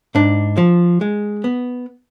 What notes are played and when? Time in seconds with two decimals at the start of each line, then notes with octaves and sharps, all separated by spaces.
0.15 G#2 D4
0.57 F3
1.01 G#3
1.44 B3